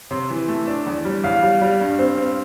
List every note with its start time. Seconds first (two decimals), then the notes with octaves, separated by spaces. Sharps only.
0.11 C3 C6
0.30 E3
0.48 A3
0.67 D4
0.86 E2
1.05 G3
1.24 E2 F5
1.42 G3
1.61 G3
1.81 G2
1.99 C4
2.18 C4